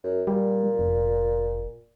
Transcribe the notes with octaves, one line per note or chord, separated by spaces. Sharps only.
F#2
A#2 G3
F1